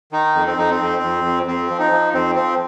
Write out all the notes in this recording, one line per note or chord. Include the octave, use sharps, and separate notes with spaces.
D#3 D#4
F2
C4
F2 D#4
C4
F2
F2
F2
F2 C4
F3
D#4
F3
F2 C4
F3 C4